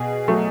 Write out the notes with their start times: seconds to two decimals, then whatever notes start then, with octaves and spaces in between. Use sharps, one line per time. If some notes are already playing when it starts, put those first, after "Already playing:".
Already playing: B2 G#4
0.28 F#3 A3